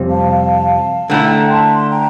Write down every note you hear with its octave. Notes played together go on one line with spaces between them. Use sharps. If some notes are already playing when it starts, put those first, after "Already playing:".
Already playing: F2 C3 G3
F5 A5
D3 A3 E4 G5 A#5
A5 C6
G5 A#5